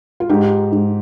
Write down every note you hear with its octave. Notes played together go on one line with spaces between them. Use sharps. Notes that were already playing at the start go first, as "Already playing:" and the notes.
F4
G#2 D#4 G4
G#2